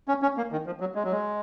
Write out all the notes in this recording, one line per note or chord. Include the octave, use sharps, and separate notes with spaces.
C#4
C#4
A#3
D#3
F3
F#3
G#3
F#3
G#3